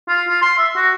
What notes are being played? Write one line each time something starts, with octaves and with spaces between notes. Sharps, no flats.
F4
F4
C6
E5
F#4